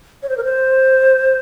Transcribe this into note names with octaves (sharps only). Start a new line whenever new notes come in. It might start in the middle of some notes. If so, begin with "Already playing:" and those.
C#5
C5
A#4
C5